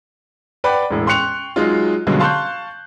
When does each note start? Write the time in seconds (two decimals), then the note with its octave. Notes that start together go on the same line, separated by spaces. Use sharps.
0.64 B4 D5 F#5 G5 B5
0.91 E1 A2
1.07 G5 C6 C#6 F#6 C#7 F7
1.56 F#3 G#3 D#4 F4
2.07 G2 B2 D3 F#3 G#3
2.19 F5 A5 C6 C#6 F#6 G6